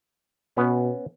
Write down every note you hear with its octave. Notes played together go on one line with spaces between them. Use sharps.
B2 B3 C#4